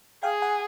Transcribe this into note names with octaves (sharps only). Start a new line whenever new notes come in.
G#4 F5 G5
F#5 G#5